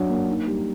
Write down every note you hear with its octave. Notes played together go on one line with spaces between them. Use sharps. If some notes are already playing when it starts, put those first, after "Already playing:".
Already playing: F#3 D4
A#3
D#4
G3